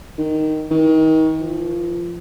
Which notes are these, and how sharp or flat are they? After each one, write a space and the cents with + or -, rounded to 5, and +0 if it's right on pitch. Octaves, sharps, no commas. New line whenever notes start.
D#3 +0
D#3 +30
F3 -20